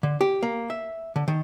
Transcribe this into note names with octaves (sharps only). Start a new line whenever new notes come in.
D3
G4
A#3
E5
D3
D#3